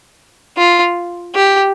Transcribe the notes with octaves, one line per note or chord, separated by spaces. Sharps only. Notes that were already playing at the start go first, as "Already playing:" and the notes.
F4
G4